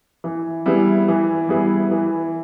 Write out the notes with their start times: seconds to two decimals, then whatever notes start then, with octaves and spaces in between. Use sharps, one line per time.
0.24 E3
0.66 G3 B3 E4 G#4
1.08 E3
1.49 G3 B3 E4 G#4
1.91 E3